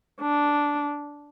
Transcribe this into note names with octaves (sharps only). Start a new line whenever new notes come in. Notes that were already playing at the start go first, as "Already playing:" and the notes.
D4